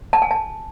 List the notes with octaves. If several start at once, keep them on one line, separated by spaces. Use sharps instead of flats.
A5
G#5
A5